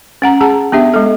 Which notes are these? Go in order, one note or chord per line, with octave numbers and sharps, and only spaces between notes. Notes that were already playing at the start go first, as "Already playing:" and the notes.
C#4 F#5 A#5
G#4 F#5 A5 A#5
B3 D4 G4 E5
G#3 A4